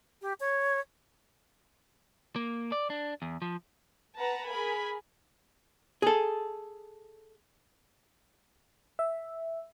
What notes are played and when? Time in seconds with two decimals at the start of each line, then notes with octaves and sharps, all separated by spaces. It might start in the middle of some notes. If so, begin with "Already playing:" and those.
0.22 G4
0.40 C#5
2.36 A#3
2.72 D5
2.90 D4
3.22 E2
3.42 F3
4.17 B4 F#5 A5 A#5
4.50 G#4 A#4 G#5 B5
6.02 G#4 A4
8.99 E5